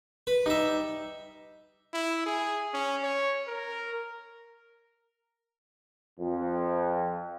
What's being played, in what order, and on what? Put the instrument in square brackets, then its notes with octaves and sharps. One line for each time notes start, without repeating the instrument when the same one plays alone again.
[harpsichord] B4
[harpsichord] G3 E5 [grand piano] D#4
[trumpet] E4
G#4
C#4
C#5
A#4
[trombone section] F2